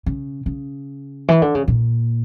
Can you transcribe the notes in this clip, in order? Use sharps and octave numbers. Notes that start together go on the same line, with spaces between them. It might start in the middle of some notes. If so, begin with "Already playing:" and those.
C#3
C#3
E3
D3
C#3
A#2